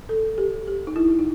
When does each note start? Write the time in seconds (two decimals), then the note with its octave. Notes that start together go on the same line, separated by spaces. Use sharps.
0.09 A4
0.38 G4
0.68 G4
0.87 D#4
0.96 E4
1.19 D#4